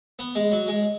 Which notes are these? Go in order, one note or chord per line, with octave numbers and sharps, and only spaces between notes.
B3
G#3
F#3
G#3